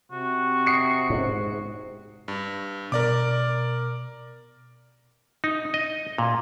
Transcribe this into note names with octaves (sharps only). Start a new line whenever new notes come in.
C3 F#4
D#6 C7 C#7
G#2
G2
B2 A#4 D5 D6
D#4
D#5
A#2